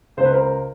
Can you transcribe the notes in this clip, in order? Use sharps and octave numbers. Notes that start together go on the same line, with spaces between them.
C#2 C5
B4
A#4 C5